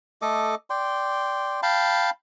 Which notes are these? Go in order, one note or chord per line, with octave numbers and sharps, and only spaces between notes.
A3 A4 D#5 D6
D5 G5 C6
F5 G5 A5 B5